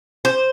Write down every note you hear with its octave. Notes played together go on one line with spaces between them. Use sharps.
C5